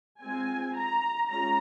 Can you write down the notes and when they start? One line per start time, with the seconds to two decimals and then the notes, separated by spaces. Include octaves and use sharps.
0.22 G#3 C4 F4 G#5
0.76 A#5
1.29 G#3 C#4 F4 A#5